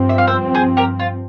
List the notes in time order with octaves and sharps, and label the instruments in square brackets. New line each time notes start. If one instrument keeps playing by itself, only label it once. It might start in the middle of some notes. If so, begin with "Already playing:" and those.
Already playing: [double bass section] G2 F3 C4
[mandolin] E5
F5
C5 E5
G#4 C5
G4 A#4
F4